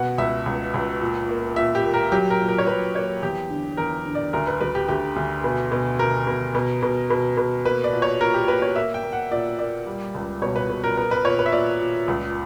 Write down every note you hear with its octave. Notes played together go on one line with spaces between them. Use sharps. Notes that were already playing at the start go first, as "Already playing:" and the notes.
Already playing: B2 F#5
C#2 E5
C#2
C#2
A#2
A#3
A#2 E5
G4
A#3
A#4
F#3 G4
A#4
A#2
A#4
C#5
F#3 B4
A#3 C#5
E2 G4
D3
E2 A#4
D3
D5
D2 A#4
B4
D2 B4
G4
D2 G4
D2
B2
B2
B2 A#4
B2
B2
B2
B2
B2
A#3 B4
D5
A#2
C#5
A#2 A#4
G4
A#3 B4
C#5
A#3 E5
G5
A#3
F#5
A#2 D5
A#3 D5
G3
C#2
B2 C#5
B4
B2
A#4
B3 A#4
B4
A#2 C#5
B4
E5
A#2 D5
A#2
C#2